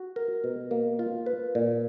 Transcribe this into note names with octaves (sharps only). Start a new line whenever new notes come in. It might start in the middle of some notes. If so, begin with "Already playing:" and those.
Already playing: F#4
A#4
B2
A#3
F4
B4
A#2